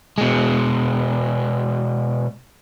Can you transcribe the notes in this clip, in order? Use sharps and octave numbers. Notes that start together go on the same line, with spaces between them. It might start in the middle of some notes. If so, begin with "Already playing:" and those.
B2 G#3